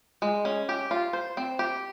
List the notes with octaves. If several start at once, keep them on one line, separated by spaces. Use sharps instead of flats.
G#3
C#4
G4
F4
C5
C4
G4